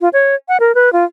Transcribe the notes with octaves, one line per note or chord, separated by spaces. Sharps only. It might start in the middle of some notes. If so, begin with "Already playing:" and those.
F4
C#5
F#5
A#4
B4
F4